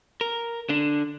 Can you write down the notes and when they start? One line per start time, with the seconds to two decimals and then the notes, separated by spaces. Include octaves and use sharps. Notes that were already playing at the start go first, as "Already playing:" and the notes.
0.21 A#4
0.69 D3 D4